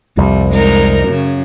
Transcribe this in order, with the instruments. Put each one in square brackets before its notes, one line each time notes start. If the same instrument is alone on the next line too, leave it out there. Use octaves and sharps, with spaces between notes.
[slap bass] C2 F2 [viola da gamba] G3
[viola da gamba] G#3 D#4 A#4
F#2 C#3